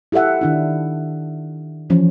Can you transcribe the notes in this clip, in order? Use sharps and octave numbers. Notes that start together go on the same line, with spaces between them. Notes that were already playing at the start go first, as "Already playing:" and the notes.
E4 G4 A4 E5 F#5
D#3 D4 E4
E3 F3 C#4